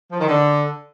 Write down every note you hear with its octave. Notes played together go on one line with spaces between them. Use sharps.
F3
D#3
D3